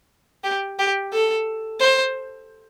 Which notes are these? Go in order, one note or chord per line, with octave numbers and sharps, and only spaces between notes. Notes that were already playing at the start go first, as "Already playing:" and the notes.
G4
G4
A4
C5